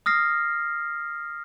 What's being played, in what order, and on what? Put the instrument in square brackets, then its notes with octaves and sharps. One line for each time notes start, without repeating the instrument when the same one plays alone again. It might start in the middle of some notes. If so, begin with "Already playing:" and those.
[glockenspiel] D#6 F6 A#6 C7